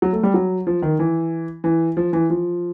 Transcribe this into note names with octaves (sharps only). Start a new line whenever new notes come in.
F#3
A3
G3
F#3
F3
D#3
E3
E3
F3
E3
F3